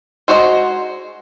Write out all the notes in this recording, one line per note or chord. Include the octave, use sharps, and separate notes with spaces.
G#3 F#4 C5 D#5 A#5